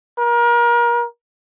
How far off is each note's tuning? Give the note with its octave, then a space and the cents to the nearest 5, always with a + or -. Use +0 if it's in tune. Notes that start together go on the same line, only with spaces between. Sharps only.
A#4 +30